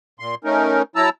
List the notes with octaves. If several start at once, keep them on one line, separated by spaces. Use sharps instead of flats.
A#2 C6
A3 C#4 D#4 A#4
F#3 E4 A5 A#5 E6